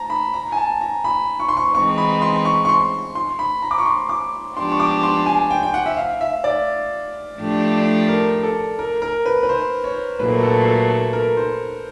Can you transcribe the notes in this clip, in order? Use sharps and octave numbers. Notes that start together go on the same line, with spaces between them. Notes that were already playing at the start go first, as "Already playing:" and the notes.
Already playing: A5 A#5
B5
A#5
G#5
A5
A#5
B5
C#6
C6
C#6
E3 G#3 C4 D#4 C#6
B5
C6
C#6
C#6
C6
C6
B5
A#5
D6
C#6
C6
D6
F3 G#3 B3 D4 G4 C6
C#6
D6
C6
G#5
G5
G5
F#5
E5
F5
E5
D5
A2 F3 A3 D4 G4
A#4
A4
A#4
A#4
B4
B4
C5
C#5
A#2 F#3 A3 B4
A4
A4
A4
A#4
C5